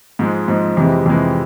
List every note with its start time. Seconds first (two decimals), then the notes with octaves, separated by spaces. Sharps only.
0.19 G#2 F3 G#3
0.48 G#2 F3 G#3
0.77 F2 C3 E3 G#3
1.06 F2 C3 E3 G#3